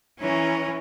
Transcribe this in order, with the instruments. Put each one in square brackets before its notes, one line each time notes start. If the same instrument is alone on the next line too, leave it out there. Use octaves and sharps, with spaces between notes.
[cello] E3 C#4 [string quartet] C#5 A#5